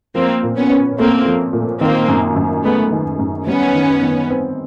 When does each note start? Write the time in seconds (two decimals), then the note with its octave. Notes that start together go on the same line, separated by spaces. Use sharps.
0.15 F3 A#3 C4
0.43 A#2
0.56 B3 C#4
0.70 C#4
0.97 A3 A#3 C4
1.26 F3
1.53 A#2
1.80 D#3 A#3 C4
2.08 F#2
2.36 F#2
2.64 G#3 A3 B3
2.92 D#3
3.19 F#2
3.47 G3 B3 C#4
3.75 D#3
4.02 D#3
4.30 C4